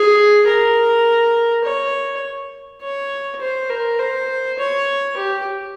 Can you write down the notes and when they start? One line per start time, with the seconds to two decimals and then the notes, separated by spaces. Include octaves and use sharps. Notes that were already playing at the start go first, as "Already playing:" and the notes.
Already playing: G#4
0.47 A#4
1.64 C#5
2.81 C#5
3.41 C5
3.69 A#4
3.99 C5
4.59 C#5
5.17 G4